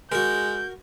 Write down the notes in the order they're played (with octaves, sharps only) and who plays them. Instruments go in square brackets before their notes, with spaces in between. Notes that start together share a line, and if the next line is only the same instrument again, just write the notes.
[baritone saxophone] G#3 [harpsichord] F#4 A#4 [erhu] G6